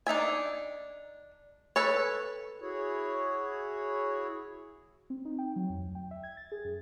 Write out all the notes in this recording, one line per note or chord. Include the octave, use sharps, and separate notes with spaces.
D4 D#4 E5 G#5
A4 B4 C#5
E4 F#4 G#4 C#5
C4
D#4
G5
F#3
F2
D2
G5
E5
G#6
A6
G#4
F#2